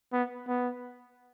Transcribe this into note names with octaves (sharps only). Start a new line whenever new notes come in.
B3
B3